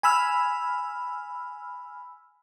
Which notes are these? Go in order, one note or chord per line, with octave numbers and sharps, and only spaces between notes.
G#5 B5 E6 F6